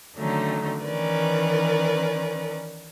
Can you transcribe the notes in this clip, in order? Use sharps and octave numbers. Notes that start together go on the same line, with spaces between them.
D3 D#3 F#3 A3 C#4 D#4
D#3 E3 C#4 A#4 B4 D5